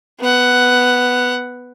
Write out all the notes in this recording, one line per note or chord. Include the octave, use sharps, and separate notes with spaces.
B3 F#5